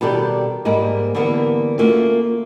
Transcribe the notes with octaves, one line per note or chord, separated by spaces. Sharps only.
B2 D#3 G3 G4 A4 D5
G#2 G3 G#3 A#3
D3 E3 G3 A#3 B3
A3 A#3 C#4 F4 F#4